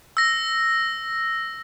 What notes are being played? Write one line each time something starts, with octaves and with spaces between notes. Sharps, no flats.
E6 A#6